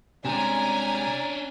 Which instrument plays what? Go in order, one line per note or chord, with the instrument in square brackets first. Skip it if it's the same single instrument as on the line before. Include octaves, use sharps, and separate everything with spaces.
[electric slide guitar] C3 G3 G#3 [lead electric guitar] C#4 D4 [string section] G#5 [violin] A#5